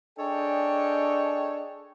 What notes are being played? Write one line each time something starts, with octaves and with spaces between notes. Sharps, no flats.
D4 G#4 A4 C#5 D#5 G5